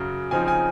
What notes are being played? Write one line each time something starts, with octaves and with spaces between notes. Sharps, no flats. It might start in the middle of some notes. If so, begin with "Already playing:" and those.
Already playing: F#2 C#3 F#3
C#3 F3 C4 D#4 G#5
G#5